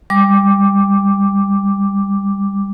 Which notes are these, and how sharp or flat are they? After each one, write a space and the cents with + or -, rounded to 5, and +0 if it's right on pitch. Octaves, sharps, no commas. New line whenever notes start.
G3 +20 D6 +0